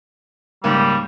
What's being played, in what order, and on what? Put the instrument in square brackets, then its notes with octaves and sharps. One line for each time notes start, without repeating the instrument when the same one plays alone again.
[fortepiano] C#2 G#2 A#3 [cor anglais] G3